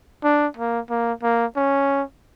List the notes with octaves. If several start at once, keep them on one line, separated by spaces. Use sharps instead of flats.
D4
A#3
A#3
A#3
C#4